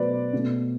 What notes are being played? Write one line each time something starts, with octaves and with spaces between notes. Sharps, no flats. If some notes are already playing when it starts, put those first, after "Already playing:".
Already playing: B2 F#3 A3 B4 C5 D5
B2 A3